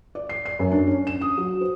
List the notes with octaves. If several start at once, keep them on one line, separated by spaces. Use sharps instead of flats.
D5
C7
C7
F#2
D4
C#4
E7
D#6
F#3
C5